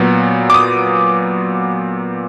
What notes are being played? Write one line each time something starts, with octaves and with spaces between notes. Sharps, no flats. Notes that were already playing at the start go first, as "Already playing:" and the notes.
Already playing: A#2 F#3 B3
D6
D#6